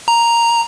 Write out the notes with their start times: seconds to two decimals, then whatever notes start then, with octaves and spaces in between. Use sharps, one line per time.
0.08 A#5